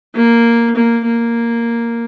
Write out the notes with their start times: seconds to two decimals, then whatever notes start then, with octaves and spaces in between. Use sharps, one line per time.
0.15 A#3
0.75 A#3
1.05 A#3